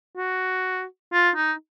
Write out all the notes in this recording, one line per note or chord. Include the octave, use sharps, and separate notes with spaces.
F#4
F4
D#4